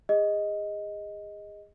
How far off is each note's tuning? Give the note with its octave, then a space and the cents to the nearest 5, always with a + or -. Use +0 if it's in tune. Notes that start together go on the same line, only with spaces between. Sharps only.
G#4 -30 D#5 +5